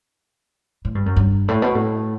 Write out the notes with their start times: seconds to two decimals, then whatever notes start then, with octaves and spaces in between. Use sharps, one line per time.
0.85 A2
0.95 G2
1.06 F#2
1.17 G2
1.48 A2
1.62 B2
1.75 A2